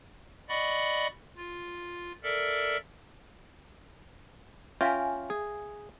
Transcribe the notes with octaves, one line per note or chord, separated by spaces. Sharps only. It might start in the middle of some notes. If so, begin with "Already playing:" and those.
D5 D#5 F#5 B5 C#6
F4
A4 A#4 D5 E5
C#4 F4 E5 F5 G5 G#5
G#4